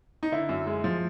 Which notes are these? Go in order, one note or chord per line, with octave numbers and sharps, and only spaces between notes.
D#4
D3 E4
F#2
G#3
F3